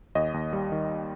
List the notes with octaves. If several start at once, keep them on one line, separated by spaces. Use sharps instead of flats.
D#2 D#5
D#2
G3
D#3